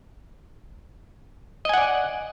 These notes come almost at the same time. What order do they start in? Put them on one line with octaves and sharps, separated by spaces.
D#5 G#5 F#5 D5